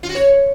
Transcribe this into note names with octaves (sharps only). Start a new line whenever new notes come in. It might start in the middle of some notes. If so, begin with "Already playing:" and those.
F4
F#4
C#5